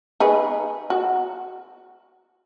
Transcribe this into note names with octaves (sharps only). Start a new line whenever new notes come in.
D#4 G#4 B4
F#4